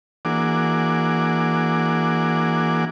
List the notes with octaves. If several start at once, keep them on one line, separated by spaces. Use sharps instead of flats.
E3 A#3 D4 F#4 G#4 D6